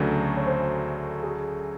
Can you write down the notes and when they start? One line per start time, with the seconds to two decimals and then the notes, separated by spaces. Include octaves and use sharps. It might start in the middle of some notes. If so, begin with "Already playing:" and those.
Already playing: D2 C#3 F#3 A3 D4 B4
0.37 C#5
0.46 C5
1.23 G#4